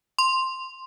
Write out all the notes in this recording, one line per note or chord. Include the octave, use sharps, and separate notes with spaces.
C6